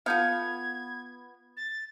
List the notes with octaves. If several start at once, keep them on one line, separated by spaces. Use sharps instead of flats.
B3 F4 A4 F5 G6 G#6
A6